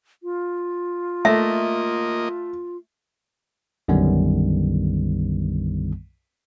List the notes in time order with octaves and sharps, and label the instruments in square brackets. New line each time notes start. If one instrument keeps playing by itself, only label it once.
[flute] F4
[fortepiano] A3 [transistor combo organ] A#3 D#5 [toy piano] E5
[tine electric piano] B1 F#2 D3 D#3 G3 B3